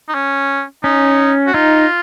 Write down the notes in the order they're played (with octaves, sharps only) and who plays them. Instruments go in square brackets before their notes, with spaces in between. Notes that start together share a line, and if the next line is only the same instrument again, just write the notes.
[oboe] D#4
C#4
[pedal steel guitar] C#4 [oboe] D#4
[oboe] F#4
[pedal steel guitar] D#4 [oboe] F4